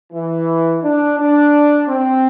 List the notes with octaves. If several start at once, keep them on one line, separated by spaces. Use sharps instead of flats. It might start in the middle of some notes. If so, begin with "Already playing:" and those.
E3
D4
D4
C4